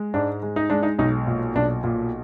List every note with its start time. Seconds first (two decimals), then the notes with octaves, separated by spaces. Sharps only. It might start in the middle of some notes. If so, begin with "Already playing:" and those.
Already playing: G#3
0.14 G#2 D4
0.43 G#3
0.56 D#4
0.70 G#3 D4
0.83 D#4
0.99 B1 D#4
1.27 A#2
1.55 B1 D4
1.84 A#2